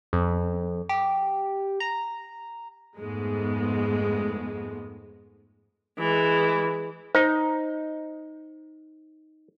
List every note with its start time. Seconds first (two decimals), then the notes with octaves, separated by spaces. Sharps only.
0.13 F2
0.89 G4
1.80 A#5
2.98 F2 G#2 G#3 A3 B3
5.99 E3 G#3
7.15 D#4 C5